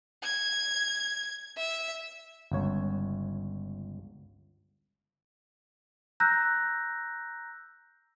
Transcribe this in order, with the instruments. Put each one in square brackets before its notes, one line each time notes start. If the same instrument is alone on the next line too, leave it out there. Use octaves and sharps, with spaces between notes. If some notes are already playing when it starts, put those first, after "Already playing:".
[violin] G#6
E5
[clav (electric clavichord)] G1 C#2 C#5
[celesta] A#5 E6 F#6 G6 A#6